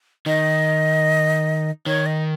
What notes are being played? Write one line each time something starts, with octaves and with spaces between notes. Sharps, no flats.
D#3 D#5
D#3 C#5
D#5